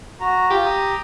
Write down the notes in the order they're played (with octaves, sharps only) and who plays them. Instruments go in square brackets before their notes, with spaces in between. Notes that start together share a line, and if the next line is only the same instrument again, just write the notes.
[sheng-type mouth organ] F#4 A#5
[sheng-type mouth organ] F4 [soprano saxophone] G4
[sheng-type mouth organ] A#5 D#6